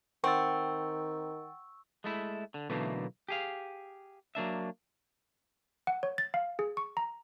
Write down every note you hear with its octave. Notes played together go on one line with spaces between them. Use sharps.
D#3 C4 F#5 G5 C#6 E6 A6
G#3 A3 E4
D3
B1 B2 D3 E3 A3 A#3
G4 G#4 F5
F#3 A#3 D4 E5
F#5
C#5
A6
F5
G#4
C#6
A#5